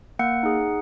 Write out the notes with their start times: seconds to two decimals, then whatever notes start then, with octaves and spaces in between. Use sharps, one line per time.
0.19 A#3 F#5
0.43 D#4 G#4